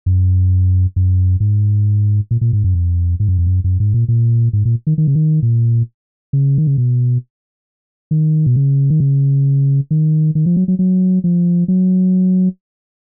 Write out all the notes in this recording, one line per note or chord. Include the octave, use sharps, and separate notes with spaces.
F#2
F#2
G#2
A#2
A#2
G#2
F#2
F2
G#2
F#2
F2
F#2
F#2
G#2
A#2
A#2
G#2
A#2
D#3
D#3
C#3
D#3
A#2
C#3
D#3
C#3
B2
D#3
B2
C#3
D#3
C#3
D#3
D#3
F3
F#3
F#3
F#3
F3
F#3